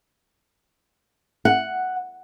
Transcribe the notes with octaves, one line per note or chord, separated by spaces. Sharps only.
F#5